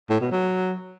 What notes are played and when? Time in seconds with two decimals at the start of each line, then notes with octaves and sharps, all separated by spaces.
0.10 A2
0.20 B2
0.31 F#3